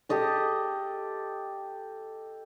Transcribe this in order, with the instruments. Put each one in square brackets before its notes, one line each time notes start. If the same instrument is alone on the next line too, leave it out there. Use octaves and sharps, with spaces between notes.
[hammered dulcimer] G4 A4 D#5 A5